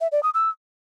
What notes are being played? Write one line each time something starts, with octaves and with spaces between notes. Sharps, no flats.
E5
D5
D#6
E6